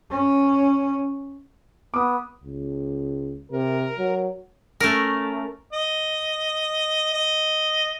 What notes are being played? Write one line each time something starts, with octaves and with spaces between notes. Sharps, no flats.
C#4
B3 D6 D#6
C#2
C3 A#4
F#3
A3 C#4 A#4
D#5
D#5